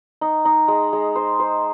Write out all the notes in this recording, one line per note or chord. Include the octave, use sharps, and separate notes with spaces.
D#4
D#4
G#3
G#3
C5
C5